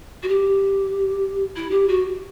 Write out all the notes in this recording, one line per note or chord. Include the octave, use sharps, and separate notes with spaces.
F#4
G4
E4
G4
F#4